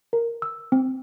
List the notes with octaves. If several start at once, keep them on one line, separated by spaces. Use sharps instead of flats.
A#4
E6
C4